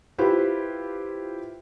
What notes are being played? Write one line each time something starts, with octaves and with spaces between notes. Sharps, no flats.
E4 F4 G4 B4 C5